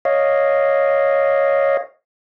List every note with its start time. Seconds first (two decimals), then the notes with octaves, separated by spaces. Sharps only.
0.05 C#5 D#5 F5